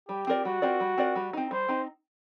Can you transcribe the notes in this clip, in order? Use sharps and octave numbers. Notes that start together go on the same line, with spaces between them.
G3 G4
C4 F4 A#4 D5
G3 F#4
C4 F4 A#4 D5
G3
C4 F4 A#4 D5
G3
C4 D#4
G3 C5
C4 D#4